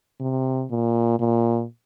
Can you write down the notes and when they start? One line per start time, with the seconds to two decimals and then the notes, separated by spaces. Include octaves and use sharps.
0.20 C3
0.71 A#2
1.20 A#2